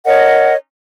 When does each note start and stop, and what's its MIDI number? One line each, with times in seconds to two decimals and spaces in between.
0.05 0.55 70
0.05 0.55 73
0.05 0.55 75
0.05 0.55 78